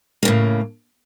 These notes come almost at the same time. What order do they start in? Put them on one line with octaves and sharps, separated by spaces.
A#3 C#3 A2